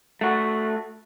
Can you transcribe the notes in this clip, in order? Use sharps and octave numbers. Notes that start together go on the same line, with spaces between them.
A3 F#4